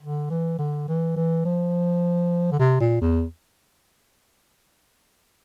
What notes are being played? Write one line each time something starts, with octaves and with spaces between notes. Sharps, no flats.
D3
E3
D3
E3
E3
F3
D3
C3
A#2
E2